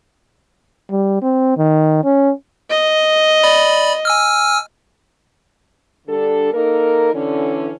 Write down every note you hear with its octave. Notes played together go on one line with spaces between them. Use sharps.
G3
C4
D#3
C#4
D#5
D5 B5
G#5 E6 F6
D3 G3 D4 A4
A#3 D#4 A4 A#4
D3 E3 C#4